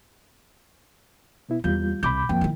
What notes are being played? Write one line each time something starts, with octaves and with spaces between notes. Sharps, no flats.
B2 B3 E4
E2 G3 A#3 F4 G6
C2 B5 D6 G6
F2 F3 A#3 G5
D#3 E4